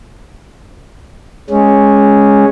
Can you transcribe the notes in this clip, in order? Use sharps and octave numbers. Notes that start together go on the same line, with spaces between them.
G#3 C#4